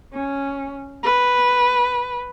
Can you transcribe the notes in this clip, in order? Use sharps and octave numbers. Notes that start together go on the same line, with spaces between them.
C#4
B4